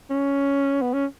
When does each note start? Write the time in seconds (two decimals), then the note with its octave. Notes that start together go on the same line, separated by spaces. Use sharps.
0.10 C#4
0.81 B3
0.93 C#4